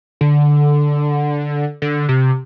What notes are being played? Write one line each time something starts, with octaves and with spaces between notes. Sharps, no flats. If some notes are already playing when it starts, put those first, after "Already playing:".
D3
D3
C3